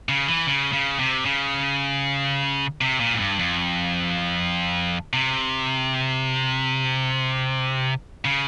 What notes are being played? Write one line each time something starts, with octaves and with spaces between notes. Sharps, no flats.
C#3
E3
C#3
C#3
C3
C#3
C3
A#2
G#2
G2
F2
C3
C#3